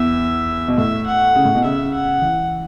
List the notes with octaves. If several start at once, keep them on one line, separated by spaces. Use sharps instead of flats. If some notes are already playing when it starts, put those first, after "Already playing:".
Already playing: E2 E5
B2
A2 E5
F#5
C#3
A2
B2
C#3 E5
F#5
E3